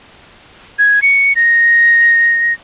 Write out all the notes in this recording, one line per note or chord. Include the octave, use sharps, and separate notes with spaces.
G#6
C#7
A#6